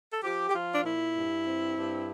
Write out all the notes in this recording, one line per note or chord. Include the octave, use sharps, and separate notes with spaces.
A4
F3 G4
G4
F3 F4
D4
A#2 E4
G2
C4
G2